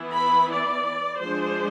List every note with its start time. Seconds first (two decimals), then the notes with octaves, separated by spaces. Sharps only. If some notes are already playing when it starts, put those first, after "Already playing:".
Already playing: E3 B3 E4
0.15 B5
0.50 D5
1.20 F3 G#3 D4 C5